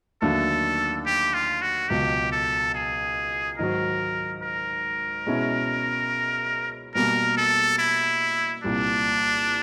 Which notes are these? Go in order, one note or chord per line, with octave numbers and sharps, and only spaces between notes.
D#2 D3 F#3 A3 D4 A4
G4
F4
F#4
C#2 B2 F#3 G4
A4
G#4
G#2 D#3 F#3 A#4
A#4
B2 G#3 C#4 E4
B2 G3 A#3 A#4
A4
E4
C2 A#2 G3 D4